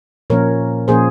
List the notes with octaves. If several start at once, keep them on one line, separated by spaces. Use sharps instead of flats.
A#2 F3 A#3 C#4 A#4 C#5
A#2 F3 A#3 C#4 G#4 C5